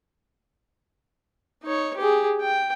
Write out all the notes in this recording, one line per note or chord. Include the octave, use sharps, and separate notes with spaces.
D#4 C#5
G4 G#4
G5